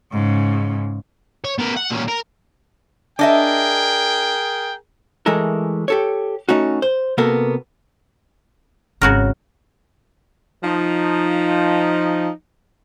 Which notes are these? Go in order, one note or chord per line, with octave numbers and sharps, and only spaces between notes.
G#2 C#3
C#5
B3 A#4
F#5
A#2 C#4
A#4
D4 G#4 A#4 D#5 E5 G5
E3 G#3 A3 A4 A#4
G4 A4 C#5
A3 C#4 D#4 F#4
C5
C3 A#3 B3 F#4 A4 A#4
G#1 C#3 F#4 A#4
F3 D#4